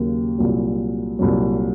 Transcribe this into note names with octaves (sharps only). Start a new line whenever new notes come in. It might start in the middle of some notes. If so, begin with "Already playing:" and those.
Already playing: D#2 C#3 F#3 A#3
C2 A#2 F#3
C2 A#2 F#3